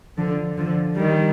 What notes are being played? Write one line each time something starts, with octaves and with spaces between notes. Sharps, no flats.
D3 F3
D3 F3
D#3 G3